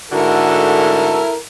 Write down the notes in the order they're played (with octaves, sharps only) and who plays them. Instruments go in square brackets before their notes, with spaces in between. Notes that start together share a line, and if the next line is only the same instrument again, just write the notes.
[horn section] G#2 D3 F#4 [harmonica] E4 A4 A#4